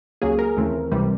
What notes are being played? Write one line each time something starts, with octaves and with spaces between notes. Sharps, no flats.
C#2 C#3 F#3 A#3 G#4
A#4
D#2 C#3 E3 A3 C4
C#2 C3 E3 G3